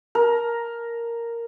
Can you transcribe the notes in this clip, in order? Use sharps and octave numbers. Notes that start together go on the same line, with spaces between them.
A#4